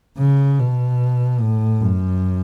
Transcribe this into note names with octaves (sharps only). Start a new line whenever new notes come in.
C#3
B2
A2
F#2